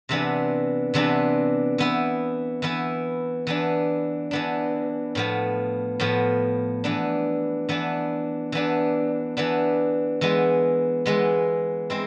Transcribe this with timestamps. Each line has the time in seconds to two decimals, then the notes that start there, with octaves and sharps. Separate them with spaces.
0.09 C3 E3 B3 D4
0.94 C3 E3 B3 D4
1.78 E3 B3 E4
2.62 E3 B3 E4
3.47 E3 B3 D4
4.31 E3 B3 D4
5.15 A2 F3 B3
6.00 A2 F3 B3
6.84 E3 B3 D4
7.69 E3 B3 D4
8.52 E3 B3 D4
9.37 E3 B3 D4
10.21 E3 G#3 B3
11.06 E3 G#3 B3
11.90 G#3 C4 E4